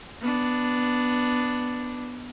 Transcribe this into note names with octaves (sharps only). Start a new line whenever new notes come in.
B3 D4